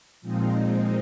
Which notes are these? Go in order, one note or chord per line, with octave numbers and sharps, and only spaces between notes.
A#2 F3 G#3 C4 D#4